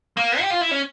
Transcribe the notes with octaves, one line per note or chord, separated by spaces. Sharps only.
A#3
G4
F4
E4
C#4